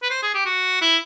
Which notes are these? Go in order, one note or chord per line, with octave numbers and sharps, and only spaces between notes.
B4
C5
G#4
G4
F#4
E4